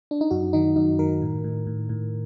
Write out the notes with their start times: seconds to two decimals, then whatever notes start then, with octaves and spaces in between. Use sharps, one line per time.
0.11 D4
0.21 D#4
0.31 F#2 F#4
0.53 D#3 D#4
0.76 F#2 D#4
0.99 D#3 A#4
1.22 A2
1.44 A2
1.67 A2
1.89 A2